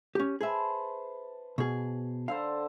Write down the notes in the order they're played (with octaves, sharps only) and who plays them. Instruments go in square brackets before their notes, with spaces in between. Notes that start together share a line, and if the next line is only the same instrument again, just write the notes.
[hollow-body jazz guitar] C#4 G4
[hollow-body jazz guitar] G#4 E5 [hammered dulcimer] B4 C5 A5
[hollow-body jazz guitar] B2 G#4
[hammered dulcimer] D3 A4 C5 [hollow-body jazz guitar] F5